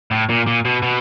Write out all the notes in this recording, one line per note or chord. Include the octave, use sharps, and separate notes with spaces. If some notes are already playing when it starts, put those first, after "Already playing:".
A2
A#2
A#2
B2
B2